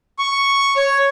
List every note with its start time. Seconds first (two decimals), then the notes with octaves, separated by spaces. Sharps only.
0.19 C#6
0.77 C#5